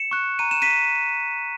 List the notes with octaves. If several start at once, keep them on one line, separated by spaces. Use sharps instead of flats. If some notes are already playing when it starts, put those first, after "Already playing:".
Already playing: C#7 E7
C#6 F#6
A#5 D#7
E7
B6 D#7